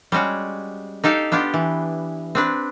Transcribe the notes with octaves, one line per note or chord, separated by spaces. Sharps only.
G3 G#3 C#4 F#4
D#4 G4 A4 F5
B3 D4 F4 G4
E3
C4 D4 B4